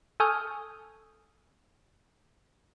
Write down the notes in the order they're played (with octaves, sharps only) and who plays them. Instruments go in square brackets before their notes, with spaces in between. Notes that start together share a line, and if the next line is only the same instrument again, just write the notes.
[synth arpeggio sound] A4 G#5 C#6 D#6 F6 G6